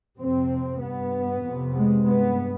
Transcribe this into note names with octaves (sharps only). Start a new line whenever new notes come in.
F2 C3 C4
G2 B3
F2
C3
G#3
G2 B3